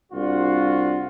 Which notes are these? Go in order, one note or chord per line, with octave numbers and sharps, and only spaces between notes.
C2 D4 F4 F#4